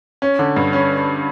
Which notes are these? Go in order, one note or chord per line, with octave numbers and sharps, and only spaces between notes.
C#4
D3
G2
C#4